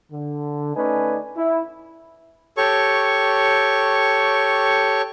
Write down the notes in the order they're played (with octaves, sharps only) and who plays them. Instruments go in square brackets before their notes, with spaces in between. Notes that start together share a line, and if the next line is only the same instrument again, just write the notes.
[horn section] D3
A3 C#4 D#4 B4 D5 G#5
E4
[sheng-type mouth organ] G4 A4 C#5 C#6